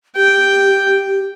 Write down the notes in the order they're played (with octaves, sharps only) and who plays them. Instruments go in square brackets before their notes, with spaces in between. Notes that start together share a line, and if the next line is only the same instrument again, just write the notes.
[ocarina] G4 [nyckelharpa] G5